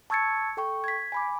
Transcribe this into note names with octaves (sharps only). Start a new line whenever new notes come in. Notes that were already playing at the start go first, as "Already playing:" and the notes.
A5 C#6 E6 G#6 A6 C#7
A4 G5 C#6
G#6 B6
G#5 B5 D6